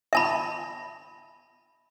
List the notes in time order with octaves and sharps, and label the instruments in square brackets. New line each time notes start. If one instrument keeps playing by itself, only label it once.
[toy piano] E5 A5 B5